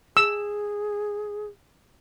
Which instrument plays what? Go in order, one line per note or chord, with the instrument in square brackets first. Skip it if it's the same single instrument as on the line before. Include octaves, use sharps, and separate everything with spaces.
[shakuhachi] G#4 [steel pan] E6